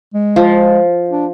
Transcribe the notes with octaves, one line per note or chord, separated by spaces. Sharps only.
G#3
F3
D4